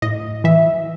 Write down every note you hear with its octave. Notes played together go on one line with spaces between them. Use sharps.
A2 D#5
E3 E5